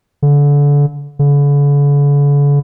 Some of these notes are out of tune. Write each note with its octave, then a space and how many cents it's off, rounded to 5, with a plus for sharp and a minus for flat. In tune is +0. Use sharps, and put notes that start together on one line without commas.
D3 -30
D3 -45